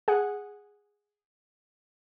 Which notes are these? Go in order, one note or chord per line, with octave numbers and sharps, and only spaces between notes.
G#4 F#5